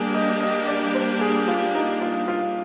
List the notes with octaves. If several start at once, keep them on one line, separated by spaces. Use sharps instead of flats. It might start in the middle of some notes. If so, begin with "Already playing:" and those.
Already playing: G3 A#3 D4 G4 G#4
D#5
D#5
D5
C5
G#4
F4
D#4
F4
F4